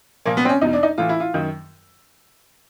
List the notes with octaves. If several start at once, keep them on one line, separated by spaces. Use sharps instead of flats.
A#2 F3 A#3
B3
C4
C#4
E2 B2 D#4
D4
D#4
A2 E3 F4
E4
F4
F#2 D#3